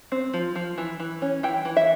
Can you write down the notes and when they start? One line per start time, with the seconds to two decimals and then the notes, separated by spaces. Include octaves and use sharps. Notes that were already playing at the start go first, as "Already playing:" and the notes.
0.12 C4
0.34 F3
0.55 F3
0.78 E3
1.00 E3
1.22 C#4
1.43 E3 G5
1.65 E3
1.77 E5